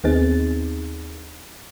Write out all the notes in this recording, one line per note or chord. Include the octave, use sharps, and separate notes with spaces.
D#2 B3 C4 D#4 G#4 A6